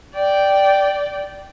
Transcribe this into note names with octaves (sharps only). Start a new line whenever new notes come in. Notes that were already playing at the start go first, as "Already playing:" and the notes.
D5 G5